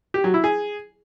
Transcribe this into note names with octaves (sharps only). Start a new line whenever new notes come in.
G4
F#3
E4
G#4